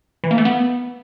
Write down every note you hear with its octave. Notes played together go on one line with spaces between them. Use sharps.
E3
A#3
A3
B3